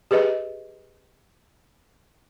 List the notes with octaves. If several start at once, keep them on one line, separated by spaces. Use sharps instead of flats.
G4 G#4 B4 D#5